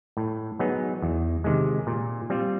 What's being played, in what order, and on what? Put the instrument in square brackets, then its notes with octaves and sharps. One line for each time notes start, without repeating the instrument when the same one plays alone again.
[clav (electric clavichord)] A2
F#3 B3 D#4 G#4
E2
C3 D#3 G#3
A#2
G3 C4 F4